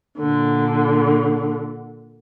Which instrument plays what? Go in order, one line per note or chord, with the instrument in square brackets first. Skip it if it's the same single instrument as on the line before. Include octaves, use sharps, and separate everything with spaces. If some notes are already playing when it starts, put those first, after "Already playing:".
[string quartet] A#2 D3